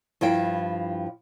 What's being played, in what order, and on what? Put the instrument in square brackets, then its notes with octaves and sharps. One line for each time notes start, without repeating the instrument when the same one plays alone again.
[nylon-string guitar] G2 F3 E4 G5